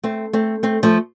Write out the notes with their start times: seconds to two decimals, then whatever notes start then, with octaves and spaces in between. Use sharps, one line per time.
0.03 A3 C4
0.33 A3 C4
0.63 A3 C4
0.83 F3 A3